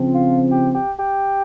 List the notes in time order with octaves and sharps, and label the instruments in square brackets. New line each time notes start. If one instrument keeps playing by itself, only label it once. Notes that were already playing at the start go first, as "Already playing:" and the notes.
Already playing: [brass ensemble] C#3 F3 C4
[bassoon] F4
G4
G4
G4